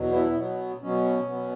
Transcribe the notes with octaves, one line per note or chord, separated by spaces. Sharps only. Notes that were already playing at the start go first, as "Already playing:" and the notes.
Already playing: E2 B2 F#3
B3 E4
B2 F#3 B3
B2 F#3 B3 C#4
B2 F#3 B3